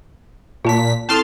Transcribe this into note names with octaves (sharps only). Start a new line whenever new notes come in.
A#2 F4 A5 B6
C4 E4 A4 A5 C6 F6